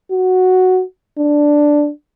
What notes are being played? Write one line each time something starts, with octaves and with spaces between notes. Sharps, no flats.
F#4
D4